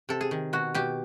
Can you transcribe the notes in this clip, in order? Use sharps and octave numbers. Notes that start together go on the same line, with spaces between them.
C3 A4
G#4
D#3
B2 F#4
B2 G4